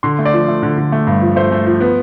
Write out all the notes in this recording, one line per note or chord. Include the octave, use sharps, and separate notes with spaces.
D3 C6
A3
D5
F3
A3
D3
D3
A3
G2
F3
A3 C5
A3
F3
B3